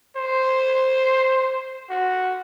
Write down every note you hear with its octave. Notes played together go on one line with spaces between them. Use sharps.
C5
F#4